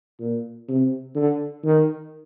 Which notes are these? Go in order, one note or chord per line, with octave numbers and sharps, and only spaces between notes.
A#2
C3
D3
D#3